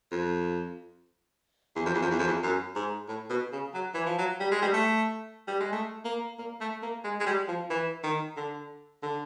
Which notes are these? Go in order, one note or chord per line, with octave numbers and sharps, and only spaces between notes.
F2
E2
F2
E2
F2
E2
F2
E2
F#2
G#2
A2
B2
C#3
F#3
E3
F3
F#3
G3
G#3
G3
A3
G3
G#3
A3
A#3
A#3
A3
A#3
G#3
G#3
G3
F3
E3
D#3
D3
D3